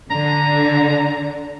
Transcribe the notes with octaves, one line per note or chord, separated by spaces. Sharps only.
D3 A#5